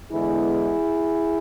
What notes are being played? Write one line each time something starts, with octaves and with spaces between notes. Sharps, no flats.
E2 D3 G#3 B3 E4 G#4